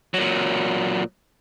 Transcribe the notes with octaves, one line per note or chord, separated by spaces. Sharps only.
A#2 F#3